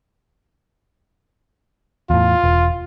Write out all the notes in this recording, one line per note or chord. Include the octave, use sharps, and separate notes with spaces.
E2 A2 F4
E1